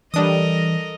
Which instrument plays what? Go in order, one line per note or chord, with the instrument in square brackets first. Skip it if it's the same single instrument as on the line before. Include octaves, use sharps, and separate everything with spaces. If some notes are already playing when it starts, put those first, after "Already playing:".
[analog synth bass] E3 [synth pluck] G3 D4 D#6 [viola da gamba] A4 A#4 D#5